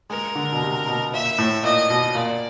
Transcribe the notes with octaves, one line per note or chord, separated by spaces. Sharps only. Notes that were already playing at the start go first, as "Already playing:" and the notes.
G#3 A#4
D3
B2
C3
B2
A#2 E5
A2
A#2 D#5
B2
A#2 D5